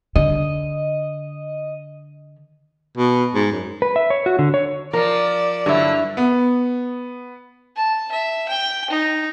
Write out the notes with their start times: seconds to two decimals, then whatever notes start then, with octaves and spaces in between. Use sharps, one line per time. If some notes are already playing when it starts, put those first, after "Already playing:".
0.16 D3 D#5
2.98 B2
3.35 G#2
3.51 F#2
3.82 B4
3.96 E5
4.10 C#5
4.26 F#4
4.39 D3
4.54 C#5
4.93 F3 A#4 D5
5.66 G2 D3 F#3 E4
6.17 B3
7.76 A5
8.12 E5
8.49 G5
8.90 D#4